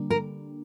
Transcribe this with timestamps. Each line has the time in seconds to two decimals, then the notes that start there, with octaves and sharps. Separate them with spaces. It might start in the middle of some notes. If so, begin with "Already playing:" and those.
Already playing: D3 G3 A#3 D4
0.10 A#4